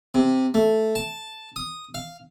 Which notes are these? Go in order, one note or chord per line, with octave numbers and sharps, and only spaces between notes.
C3
A3
A5
D#6
F5